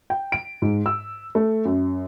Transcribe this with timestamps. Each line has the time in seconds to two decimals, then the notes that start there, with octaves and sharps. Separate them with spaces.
0.10 G5
0.32 D7
0.62 G#2
0.86 E6
1.35 A3
1.65 F#2